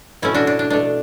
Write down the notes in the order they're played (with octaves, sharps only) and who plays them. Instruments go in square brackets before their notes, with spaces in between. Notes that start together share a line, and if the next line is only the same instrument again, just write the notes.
[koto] B2 A3 C#4 E4
D4 F#4
D4
D4
B2 A3 D4